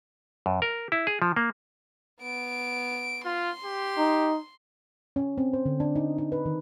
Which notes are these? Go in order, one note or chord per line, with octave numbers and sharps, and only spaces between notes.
F#2
A#4
E4
G#4
F3
A#3
B3 D7
F4 C6
G4
D#4
C#4
C4
C5
D3
D4
D#4
D#4
B4
D#3